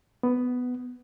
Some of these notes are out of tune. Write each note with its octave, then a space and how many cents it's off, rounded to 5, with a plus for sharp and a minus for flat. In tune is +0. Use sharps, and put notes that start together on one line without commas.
B3 +10